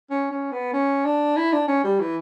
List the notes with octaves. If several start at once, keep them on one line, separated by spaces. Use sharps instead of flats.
C#4
C#4
B3
C#4
D4
E4
D4
C#4
G3
E3